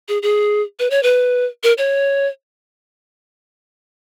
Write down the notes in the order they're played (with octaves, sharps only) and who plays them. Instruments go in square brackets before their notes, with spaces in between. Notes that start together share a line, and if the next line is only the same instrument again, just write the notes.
[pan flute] G#4
G#4
B4
C#5
B4
A#4
C#5